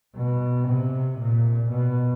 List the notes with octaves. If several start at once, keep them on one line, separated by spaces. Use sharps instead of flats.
B2
C3
A#2
B2